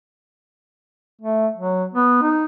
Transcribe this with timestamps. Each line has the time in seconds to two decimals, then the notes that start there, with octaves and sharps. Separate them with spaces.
1.21 A3
1.56 F#3
1.93 B3
2.22 D#4